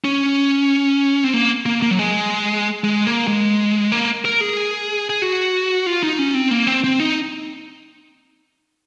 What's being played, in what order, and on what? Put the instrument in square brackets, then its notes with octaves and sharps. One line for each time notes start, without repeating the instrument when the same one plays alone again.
[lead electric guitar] C#4
C4
A#3
A#3
A#3
F#3
G#3
G#3
A#3
G#3
A#3
A#4
G#4
G#4
F#4
F4
D#4
C#4
C4
A#3
C4
C4
D#4